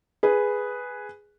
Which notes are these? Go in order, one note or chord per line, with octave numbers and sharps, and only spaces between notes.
G#4 B4